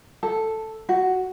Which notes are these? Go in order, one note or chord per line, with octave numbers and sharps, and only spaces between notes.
A4
F#4